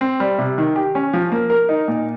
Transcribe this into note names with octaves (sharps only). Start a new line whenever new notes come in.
C4
G3
C3
D#3
G4
C#4
F3
A#3
A#4
D#4
A#2